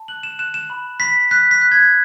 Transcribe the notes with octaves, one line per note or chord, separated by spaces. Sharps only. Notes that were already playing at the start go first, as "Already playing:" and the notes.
Already playing: A5
F#6 F#7
E7
F#6 E7
E7
B5
B5 B6
F#6 B6
B6
F#6
G#6